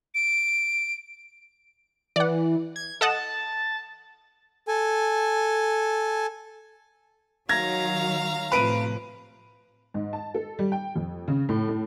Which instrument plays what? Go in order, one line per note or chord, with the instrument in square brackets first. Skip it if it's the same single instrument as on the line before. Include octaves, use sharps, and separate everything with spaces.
[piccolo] D7
[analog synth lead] E3 [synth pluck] D5 F#5
[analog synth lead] G#6
[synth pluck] A4 D#5 F#5 [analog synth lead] A5
[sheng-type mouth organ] A4 G#5
[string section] D#3 F#3 [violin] F5 A#5 [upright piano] G#6 A#6
[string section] A2 C3 F3 [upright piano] B4 D7 D#7
[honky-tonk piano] G#2
A5
A4
G3
G5
F2
C#3
A2
A2